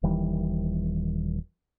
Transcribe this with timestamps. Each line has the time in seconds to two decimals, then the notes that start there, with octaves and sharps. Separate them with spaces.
0.03 D#1 D#3 E3 G3